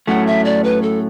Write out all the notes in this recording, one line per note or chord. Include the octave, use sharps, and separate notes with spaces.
A2 F#3 A3 C#4 F#5
E5
D5
B4
A4